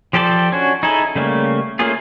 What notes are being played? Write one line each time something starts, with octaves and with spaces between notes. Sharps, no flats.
F3 G4 A4 C5 D5
C#4 D4 F#4
D#4 E4 G#4 A4
C#3 G3 A3 A#3
A3 A#3 C#4 F4 G#4